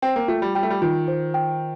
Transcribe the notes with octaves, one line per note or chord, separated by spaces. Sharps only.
C4 G5
A#3
A3 F4
G3
G3 G5
A3
G3
D#3 F4
C5
G5